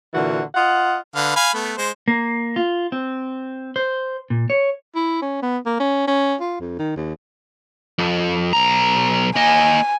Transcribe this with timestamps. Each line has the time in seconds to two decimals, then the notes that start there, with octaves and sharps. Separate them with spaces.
0.14 A#2 D3 E3 F#4
0.54 F4 D#5 F#5
1.15 D3 B4 F5
1.36 F5 G#5 B5
1.54 A3 B3
1.78 G#3 C5
2.08 A#3
2.56 F4
2.92 C4
3.76 C5
4.30 A#2
4.50 C#5
4.95 E4
5.22 C#4
5.42 B3
5.66 A#3
5.80 C#4
6.07 C#4
6.40 F4
6.60 F2
6.79 D#3
6.96 D#2
7.99 F2
8.53 B1 A#5
9.36 A#3 D#5 G#5